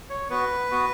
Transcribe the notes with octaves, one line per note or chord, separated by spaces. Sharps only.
C#5
B3 F#4 B4
B3 F#4